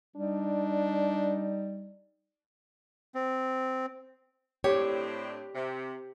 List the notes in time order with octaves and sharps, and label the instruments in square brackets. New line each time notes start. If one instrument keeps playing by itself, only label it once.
[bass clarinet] G3 [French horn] D4 [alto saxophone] D#4
[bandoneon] C4
[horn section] A2 C4 D4 [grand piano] G4 [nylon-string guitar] C#5
[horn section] C3